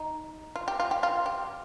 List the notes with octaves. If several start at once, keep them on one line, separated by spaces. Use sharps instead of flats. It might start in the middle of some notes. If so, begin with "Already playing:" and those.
Already playing: D#4
F4
G4
F4
G4
F4
G4